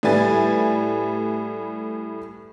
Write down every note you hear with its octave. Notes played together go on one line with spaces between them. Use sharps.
A2 G3 E4 B4 G#5 A6